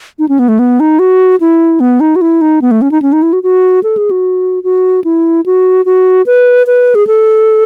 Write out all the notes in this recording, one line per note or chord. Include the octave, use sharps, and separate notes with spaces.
D#4
C#4
B3
A3
B3
D#4
F#4
E4
B3
D#4
F#4
E4
D#4
B3
A3
C#4
D#4
C#4
D#4
E4
F#4
F#4
A4
G#4
F#4
F#4
E4
F#4
F#4
B4
B4
G#4
A4